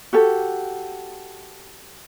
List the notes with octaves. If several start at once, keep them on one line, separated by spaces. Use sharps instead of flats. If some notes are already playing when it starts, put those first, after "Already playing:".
F#4 G4 A4